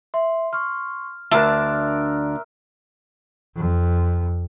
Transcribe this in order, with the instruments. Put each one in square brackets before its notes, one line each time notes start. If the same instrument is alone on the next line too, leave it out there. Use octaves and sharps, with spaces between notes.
[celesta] E5 [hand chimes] C6
[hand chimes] C6 C#6 [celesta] F6
[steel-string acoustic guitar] D2 D4 A5 [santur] A#4 E5 [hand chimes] C6 D6 F#6
[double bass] F2